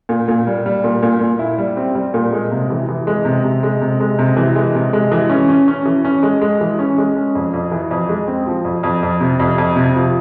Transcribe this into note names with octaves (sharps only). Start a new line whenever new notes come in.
A#2
A#2
G3
G3
A#2
A#2
A#2
E4
G3
C4
G3
A#2
G#3
C3
E3
E3
G#3
C3
C3
G#3
C3
G#3
C3
E3
G#3
C3
G#3
E3
C#4
C#4
C#4
E3
C#4
G#3
G#3
E3
C#4
G#3
C#4
F2
F2
E3
F2
G#3
C4
F3
F2
F2
F2
C3
F2
F2
C3
F3